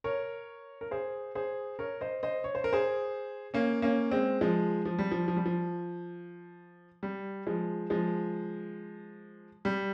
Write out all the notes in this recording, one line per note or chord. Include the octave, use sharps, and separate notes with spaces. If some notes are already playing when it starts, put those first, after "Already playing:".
A#4 C#5
A#4
G#4 C5
G#4 C5
A#4 C#5
C5 D#5
C5 D#5
C#5
C5
A#4
G#4 C5
A#3 C#4
A#3 C#4
G#3 C4
F3 G#3
F3
G3
F3
F3
G3
F3
G3
F3 G#3
F3 G#3
G3